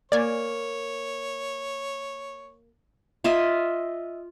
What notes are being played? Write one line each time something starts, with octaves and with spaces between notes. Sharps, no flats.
A#3 C#5 D5 G#5
F4 D#5 E5